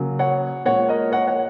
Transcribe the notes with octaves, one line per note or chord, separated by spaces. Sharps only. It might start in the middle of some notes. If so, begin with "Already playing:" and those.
Already playing: C#3 F#3 A#3
C#5 F#5
A#2 G#3 C#5 F#5
A#4 D#5
C#5 F#5
C#5 F#5